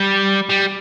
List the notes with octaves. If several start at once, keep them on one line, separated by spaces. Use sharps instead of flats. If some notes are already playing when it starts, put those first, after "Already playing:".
Already playing: G3
G3